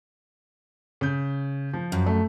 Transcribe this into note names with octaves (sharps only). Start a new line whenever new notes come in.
C#3 G6
F3
F#2
A3